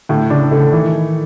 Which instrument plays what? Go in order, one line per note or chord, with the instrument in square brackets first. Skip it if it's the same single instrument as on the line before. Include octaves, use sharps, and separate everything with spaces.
[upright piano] A2 [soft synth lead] D3
[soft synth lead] C#3 [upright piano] D4
[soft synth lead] C#3 [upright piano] A3
[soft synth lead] D#3 [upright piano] E3